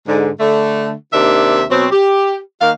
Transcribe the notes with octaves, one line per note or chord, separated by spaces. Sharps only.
G#2 D3
D3 A3
D#2 C3 D#3 D4 E5
B2 F#3 C4
G4
D#3 A#3 F5